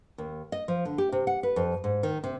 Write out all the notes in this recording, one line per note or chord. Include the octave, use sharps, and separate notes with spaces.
D#2
D#5
F3
D3
G4
C3
F#5
B4
F2
G#2
D#3
C3